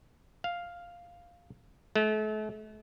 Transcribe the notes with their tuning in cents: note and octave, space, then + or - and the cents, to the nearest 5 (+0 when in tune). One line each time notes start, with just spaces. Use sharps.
F5 +0
A3 -40